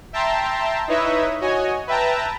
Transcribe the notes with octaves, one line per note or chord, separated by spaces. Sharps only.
E5 G5 A5 A#5 C6
D#4 E4 B4 C#5 D#5 E5
F#4 C#5 D#5 G#5
B4 E5 G5 A5 A#5